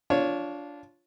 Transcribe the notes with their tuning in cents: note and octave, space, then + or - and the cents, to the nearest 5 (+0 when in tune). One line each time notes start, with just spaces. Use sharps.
D4 -15 F4 +0 C#5 +0